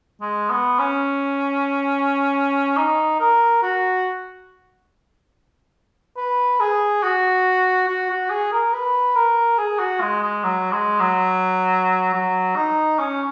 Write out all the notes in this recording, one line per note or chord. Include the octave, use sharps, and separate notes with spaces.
G#3
B3
C#4
D#4
A#4
F#4
B4
G#4
F#4
F#4
F#4
G#4
A#4
B4
A#4
G#4
F#4
G#3
G#3
F#3
G#3
F#3
F#3
D#4
C#4